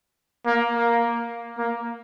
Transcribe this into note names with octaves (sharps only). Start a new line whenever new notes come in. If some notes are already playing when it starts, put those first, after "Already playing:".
A#3
A#3
A#3